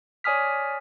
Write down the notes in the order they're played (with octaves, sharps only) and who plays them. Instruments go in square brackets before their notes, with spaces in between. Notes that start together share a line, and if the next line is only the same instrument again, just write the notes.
[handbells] C#5 D5 G#5 D#6 F6 B6